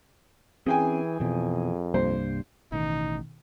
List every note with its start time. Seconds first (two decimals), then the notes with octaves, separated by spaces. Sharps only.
0.66 E3 C4 C#4 G#4 G5 G#5
1.20 F2 B2 E3
1.94 C2 G2 A#3 C5
2.72 A1 B2 D#3 D#4